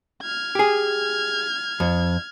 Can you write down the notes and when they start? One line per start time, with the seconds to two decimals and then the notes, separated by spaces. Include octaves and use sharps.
0.22 F6 G#6
0.55 G4 G#4
1.80 F2